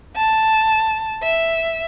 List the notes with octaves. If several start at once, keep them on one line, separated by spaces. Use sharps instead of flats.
A5
E5